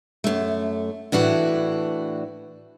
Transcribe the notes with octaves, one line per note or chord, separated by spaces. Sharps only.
F#2 A3
A2 E3 D4 F#4